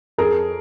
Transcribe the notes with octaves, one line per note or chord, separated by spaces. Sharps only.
F2 G#4 A#4